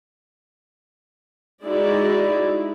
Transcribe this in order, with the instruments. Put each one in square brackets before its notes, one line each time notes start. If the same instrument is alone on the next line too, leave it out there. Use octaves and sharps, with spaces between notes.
[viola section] G#3 D#4 E4 F#4 D5